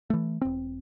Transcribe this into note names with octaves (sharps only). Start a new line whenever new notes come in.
E3 A3
E1 C4